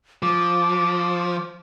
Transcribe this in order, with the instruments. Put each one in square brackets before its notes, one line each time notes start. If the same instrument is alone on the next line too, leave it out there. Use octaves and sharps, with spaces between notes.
[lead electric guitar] F3 [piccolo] D6